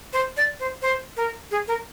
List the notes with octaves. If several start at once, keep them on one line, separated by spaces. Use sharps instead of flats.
C5
D5
C5
C5
A#4
G#4
A#4